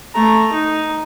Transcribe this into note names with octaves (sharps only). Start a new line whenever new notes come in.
A3 A#5
D#4